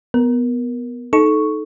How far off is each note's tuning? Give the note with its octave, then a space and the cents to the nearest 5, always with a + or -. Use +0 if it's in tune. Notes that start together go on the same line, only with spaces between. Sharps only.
B3 +0 A#4 +10
D#4 +0 A4 -20 C#6 +0